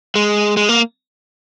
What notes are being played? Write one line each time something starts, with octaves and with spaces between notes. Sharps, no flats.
G#3
G#3
A#3